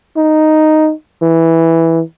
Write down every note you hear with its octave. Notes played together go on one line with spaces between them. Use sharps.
D#4
E3